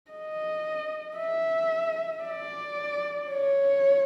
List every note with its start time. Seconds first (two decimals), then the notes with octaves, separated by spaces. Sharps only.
0.11 D#5
1.17 E5
2.24 D5
3.30 C#5